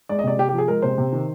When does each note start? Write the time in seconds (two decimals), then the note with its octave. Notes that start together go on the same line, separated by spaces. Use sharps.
0.09 G#3 D5
0.19 D#5
0.24 C3 D5
0.38 C3 G4
0.49 G4
0.53 F3 G#4
0.68 G#3 A#4
0.82 C3 C5
0.98 C3
1.12 D#3